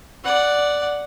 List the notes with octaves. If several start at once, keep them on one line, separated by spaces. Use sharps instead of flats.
D5 F#5